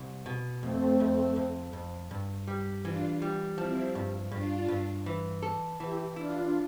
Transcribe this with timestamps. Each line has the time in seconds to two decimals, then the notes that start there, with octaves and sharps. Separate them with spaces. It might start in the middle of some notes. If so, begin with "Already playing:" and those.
Already playing: C2
0.26 B2
0.63 F2 A3 C4
1.00 F2
1.36 F2
1.73 F2
2.11 G2
2.48 G3
2.84 E3 D4 F4
3.22 G3
3.58 F3 C4 E4
3.95 G2
4.31 G2 D4 F4
4.68 G2
5.06 E3
5.43 A4
5.80 E3 E4 G4
6.16 D4 E4 F4